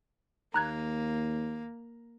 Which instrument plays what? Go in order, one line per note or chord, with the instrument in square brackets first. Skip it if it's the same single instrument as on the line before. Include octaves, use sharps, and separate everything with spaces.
[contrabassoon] D#2 [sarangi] A#3 [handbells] A#5 F#6 G#6